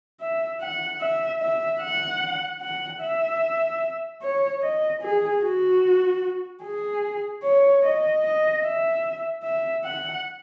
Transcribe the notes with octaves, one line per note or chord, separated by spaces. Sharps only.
E5
F#5
E5
E5
F#5
F#5
E5
C#5
D#5
G#4
F#4
G#4
C#5
D#5
D#5
E5
E5
F#5